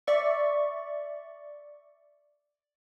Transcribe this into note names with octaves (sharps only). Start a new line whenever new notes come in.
D5 E5 C#6